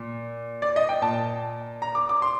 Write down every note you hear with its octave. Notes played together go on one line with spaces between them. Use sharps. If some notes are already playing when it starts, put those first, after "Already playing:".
Already playing: A#2
D5
D#5
G5
A#2 A5
A#5
D6
D6
C6